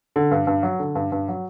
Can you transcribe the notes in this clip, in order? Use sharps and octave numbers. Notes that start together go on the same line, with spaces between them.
D3
G2
G2
F#3
D3
G2
G2
F#3